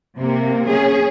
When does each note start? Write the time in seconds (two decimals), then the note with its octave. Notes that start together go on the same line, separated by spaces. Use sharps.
0.17 C3 A#3
0.69 C#4 G#4